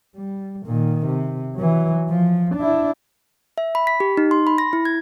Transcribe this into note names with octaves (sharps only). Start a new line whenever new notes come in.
G3
A#2 D#3
C3
E3 F#3
F3
D4 E4
E5
B5
B6
G4
D#4
C6
B5
A#6
E4
G#6